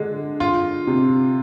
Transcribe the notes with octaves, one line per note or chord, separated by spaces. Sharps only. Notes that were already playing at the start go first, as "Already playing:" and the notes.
Already playing: D3 G#3
F4
C3